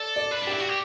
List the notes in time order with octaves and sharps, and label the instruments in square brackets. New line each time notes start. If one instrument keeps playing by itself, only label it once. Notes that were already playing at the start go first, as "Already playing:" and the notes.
Already playing: [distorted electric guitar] A4 [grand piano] D5
[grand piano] D5
[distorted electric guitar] B4
D4
[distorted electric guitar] E4 [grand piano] G4
[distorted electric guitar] F#4
G4